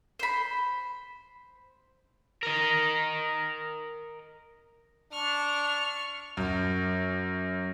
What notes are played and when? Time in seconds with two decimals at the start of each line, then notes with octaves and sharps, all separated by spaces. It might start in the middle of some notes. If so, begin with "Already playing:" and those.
0.19 C5 B5
2.43 A#4 D#5
5.12 D4 C#6 F6
6.37 F#2